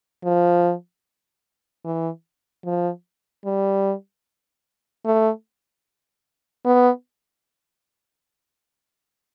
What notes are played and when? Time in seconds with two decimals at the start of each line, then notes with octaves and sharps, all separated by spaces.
0.25 F3
1.85 E3
2.65 F3
3.45 G3
5.05 A3
6.65 B3